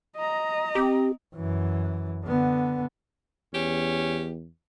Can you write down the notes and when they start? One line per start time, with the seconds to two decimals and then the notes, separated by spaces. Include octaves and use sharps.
0.16 D#5 A#5
0.75 C4 G4
1.36 F#2 E3
2.24 D3 B3
3.54 E2 C#4 G4